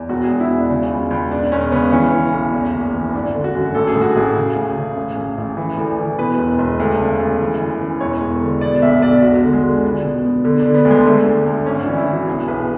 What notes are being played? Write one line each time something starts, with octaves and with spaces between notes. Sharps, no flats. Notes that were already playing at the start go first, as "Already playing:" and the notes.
Already playing: E2
E1 F#4
G#4
E2
E4
E1
D4
C#3
C#2
C#2
E1 D4
E1 C#4
C#3 B3
E3 C#4
E3
B1
E2
F#1
E3
G#1 D4
D3
F#4
F#2
A1 A4
G#4
A2
F#4
A1 G#4
C#3
D2
C#3
A1
A1
A1
E3
D2
E3
B2 B4
E1
E1
D2
C#3
D2
E3
F#2
E3
E1 C#5
E1
D3
B2 D5
B1 E5
B1 D5
E1 F#4
D3
G#3
D3
C#2 D4
B2
B2
D3
D4
D3
B3
D2
G#3
D3 A3
D2
D2
G#1 C#4
D4
E3
E4
E3
F#4
B1 G#4
B1 B4